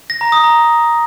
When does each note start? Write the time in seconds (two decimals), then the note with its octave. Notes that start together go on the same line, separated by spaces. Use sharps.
0.10 A#6
0.21 A#5
0.32 D#6
0.44 A#5